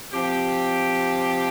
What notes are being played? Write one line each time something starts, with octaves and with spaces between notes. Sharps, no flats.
F3 C4 G4